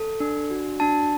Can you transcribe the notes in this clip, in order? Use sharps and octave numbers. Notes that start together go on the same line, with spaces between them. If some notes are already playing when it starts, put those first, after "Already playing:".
Already playing: A4
D4
F#4
D4 A5